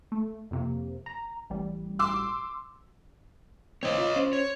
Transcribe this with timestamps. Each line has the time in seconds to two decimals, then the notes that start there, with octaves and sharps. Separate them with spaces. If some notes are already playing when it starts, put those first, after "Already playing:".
0.12 A3
0.51 F2 C3 A#3
1.06 A#5
1.50 A1 G3
1.99 C6 D6 E6
3.83 A2 D#3 C4 C#5 D#5
3.98 F4
4.16 C#4 C5
4.33 C#5